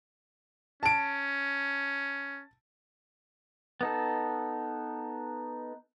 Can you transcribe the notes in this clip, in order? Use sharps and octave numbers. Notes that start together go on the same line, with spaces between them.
C#4 A5 D7
B3 D#4 A4